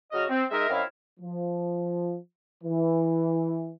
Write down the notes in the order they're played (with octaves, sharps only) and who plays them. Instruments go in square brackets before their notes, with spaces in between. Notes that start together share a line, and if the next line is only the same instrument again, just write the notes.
[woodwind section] C#3 F#3 F#4 D#5 D#6 F6
C4
G#3 D#4 A#4 E5
F#2 C4 E4 D#5 F5
[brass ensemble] F3
E3